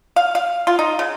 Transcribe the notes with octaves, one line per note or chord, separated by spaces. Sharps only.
F5
F5
F4
D#4
C#3